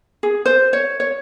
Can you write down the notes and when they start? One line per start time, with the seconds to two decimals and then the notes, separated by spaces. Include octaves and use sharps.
0.23 G#4
0.46 C5
0.73 C#5
1.00 C#5